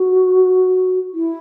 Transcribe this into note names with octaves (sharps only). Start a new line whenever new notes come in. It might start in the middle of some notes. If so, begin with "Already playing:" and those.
Already playing: F#4
E4